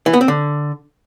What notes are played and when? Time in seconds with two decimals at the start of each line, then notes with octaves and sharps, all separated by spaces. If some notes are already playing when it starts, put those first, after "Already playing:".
0.06 E3
0.13 B3
0.21 C4
0.28 D3